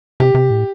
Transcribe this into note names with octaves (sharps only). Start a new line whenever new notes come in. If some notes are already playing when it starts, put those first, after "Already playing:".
C3 G4
C3
A2